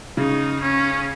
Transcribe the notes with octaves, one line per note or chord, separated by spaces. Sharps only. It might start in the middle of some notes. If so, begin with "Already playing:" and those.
C#3 D#4
C#4